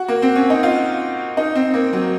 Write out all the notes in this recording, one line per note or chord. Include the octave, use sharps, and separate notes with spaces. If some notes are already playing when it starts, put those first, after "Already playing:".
Already playing: F#4
A#3
C4
C#4
D#4
F4
D#4
C4
A#3
F#3